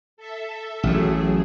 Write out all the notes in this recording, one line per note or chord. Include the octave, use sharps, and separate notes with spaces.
A4 E5
A1 A2 F#3 G#4